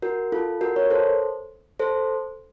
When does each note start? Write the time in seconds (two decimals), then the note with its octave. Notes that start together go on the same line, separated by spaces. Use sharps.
0.02 F#4 A#4
0.32 F4 A4
0.61 F#4 A#4
0.76 A#4 C#5
0.90 A4 C5
1.79 A4 C5